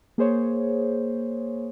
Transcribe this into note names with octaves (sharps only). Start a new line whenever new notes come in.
A#3 G#4 C5 C#5